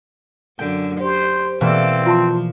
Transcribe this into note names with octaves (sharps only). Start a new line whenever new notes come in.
F#2 D3 G5
G4 C5
B2 E3 A#3 C4 A4 D5
F3 F4 A5 C6